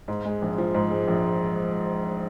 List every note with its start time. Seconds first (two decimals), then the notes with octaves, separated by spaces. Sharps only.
0.08 G#2
0.25 G#3
0.42 A#1
0.58 F3
0.75 G#2
0.91 G#3
1.08 A#1